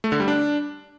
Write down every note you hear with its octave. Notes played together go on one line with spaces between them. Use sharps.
A3
D3
G3
D4